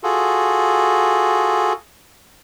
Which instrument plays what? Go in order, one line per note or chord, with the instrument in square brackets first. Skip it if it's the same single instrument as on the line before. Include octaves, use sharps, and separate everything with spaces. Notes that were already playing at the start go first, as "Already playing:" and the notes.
[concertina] F4 F#4 G#4 A4